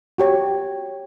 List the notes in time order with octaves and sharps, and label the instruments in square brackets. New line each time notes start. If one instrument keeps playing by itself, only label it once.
[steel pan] F#4 G4 C#5